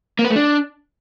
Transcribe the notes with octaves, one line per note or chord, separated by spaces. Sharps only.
A#3
B4
A3
D4